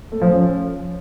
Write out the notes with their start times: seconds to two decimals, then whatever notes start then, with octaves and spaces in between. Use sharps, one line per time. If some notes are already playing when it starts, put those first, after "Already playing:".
0.12 A3
0.21 F3
0.31 C#4